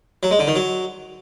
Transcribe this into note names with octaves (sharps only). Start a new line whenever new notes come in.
F#3
G#3
D3
D#3
F#3